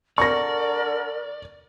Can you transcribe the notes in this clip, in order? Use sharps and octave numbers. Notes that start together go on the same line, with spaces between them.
D3 A#4 D5 C#6 A#6